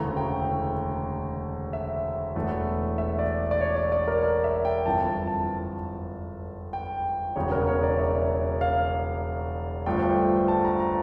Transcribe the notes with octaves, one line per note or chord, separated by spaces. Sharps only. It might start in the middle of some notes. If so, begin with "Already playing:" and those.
Already playing: E1 D2 C#3 E3 A3 A#5
G5
E5
E1 E2 E3 A3
E5
D5
D5
C#5
D5
D5
A#4
D5
E5
G5
G1 F2 E3 A5
A5
A5
G5
E1 E2 C#3 C#5
A#4
C#5
D5
E5
F5
G1 G2 F3 A3 G5
A5
A#5
A#5